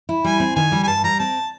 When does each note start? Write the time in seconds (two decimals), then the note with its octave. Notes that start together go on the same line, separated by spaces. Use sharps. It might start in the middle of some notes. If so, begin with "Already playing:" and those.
0.09 E4
0.24 G3 G#5
0.40 C4
0.56 D#3 G#5
0.72 G3
0.83 G#5
0.87 G2 A5
1.04 G3 A#5
1.19 C4 A5